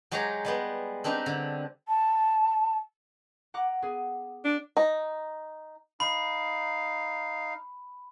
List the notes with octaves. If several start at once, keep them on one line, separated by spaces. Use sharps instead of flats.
F#3 G#3 D#4 G4 G#4 A#5
G3 G#3 B3
C4 D4 D#4 G4 B4
D3
A5
F#5 A#5 D6
B3 G#4
D4
D#4
D#4 F5 B5